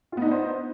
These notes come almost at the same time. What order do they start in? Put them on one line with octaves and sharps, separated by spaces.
F4 B3 D#4 D4 C5